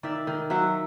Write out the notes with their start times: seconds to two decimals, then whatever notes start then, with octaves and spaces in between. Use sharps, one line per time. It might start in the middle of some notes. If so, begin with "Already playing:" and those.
0.03 D#3 D5 E5
0.27 D#3
0.50 F#3 E5 F#5